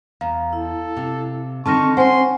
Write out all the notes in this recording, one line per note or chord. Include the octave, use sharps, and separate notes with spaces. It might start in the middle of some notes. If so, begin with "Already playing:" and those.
E2 F5 A#5
E4 A4
C3
D3 D#3 C4 D#4 A5 C#6 F6 A#6
C#4 C5 F#5 G#5 C6